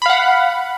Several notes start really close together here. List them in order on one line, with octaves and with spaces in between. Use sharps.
B5 F5 F#5